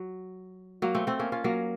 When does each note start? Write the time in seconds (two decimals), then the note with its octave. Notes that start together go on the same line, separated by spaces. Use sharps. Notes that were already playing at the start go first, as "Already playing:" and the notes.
Already playing: F#3
0.82 F#3 A#3
0.95 A3 C4
1.07 A3 C4
1.19 A#3 C#4
1.32 C#4 F4
1.44 F#3 A#3